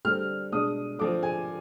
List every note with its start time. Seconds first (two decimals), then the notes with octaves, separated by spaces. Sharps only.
0.05 D3 G3 C4 F6
0.52 B2 G#3 D4 D#6
0.99 D3 F3 C4 D6
1.23 G#5